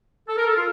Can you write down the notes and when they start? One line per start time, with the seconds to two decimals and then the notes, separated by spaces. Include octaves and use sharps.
0.29 A4
0.37 A#4
0.47 A4
0.56 F4